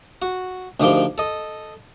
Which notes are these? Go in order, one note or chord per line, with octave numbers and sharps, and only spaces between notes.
F#4
D2 D#3 F3 G4 G5 C6
A4 D#5